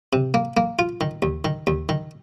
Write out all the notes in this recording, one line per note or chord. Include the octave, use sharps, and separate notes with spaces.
C3
A#3
A#3
F4
D#3
D#2
D#3
D#2
D#3